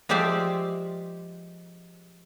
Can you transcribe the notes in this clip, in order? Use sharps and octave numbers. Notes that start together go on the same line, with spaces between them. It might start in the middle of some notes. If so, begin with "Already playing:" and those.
F3 G#3 G4 C5 D5 E5